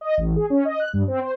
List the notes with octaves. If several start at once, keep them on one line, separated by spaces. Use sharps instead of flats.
D#5
A1
G#4
C#4
D#5
F#6
G2
C4
C5